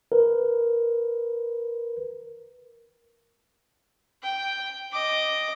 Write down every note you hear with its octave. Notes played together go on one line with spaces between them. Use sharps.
A#4 B4
G5
D#5 D6